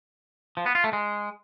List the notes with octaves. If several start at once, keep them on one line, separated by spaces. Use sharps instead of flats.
F3
B3
F4
A3
G#3